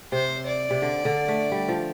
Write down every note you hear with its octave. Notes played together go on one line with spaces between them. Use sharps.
C3 C5
D5
C3
D3
D3
A3
G3
F3